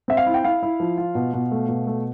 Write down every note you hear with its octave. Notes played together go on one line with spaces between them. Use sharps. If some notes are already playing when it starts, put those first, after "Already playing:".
C4 E5
F5
E4
G5
E4 F5
E4
F3
F4
B2
B2
A3
B2
A3